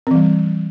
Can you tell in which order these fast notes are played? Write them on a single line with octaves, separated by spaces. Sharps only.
C4 E3 G3